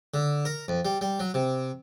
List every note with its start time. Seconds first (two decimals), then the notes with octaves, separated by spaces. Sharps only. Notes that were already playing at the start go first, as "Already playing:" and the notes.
0.14 D3
0.45 A#4
0.68 F2
0.85 G3
1.01 G3
1.20 F#3
1.34 C3